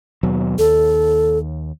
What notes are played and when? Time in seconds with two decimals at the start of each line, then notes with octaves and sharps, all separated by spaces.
0.23 D#2 B2 F#3
0.58 D#2 A4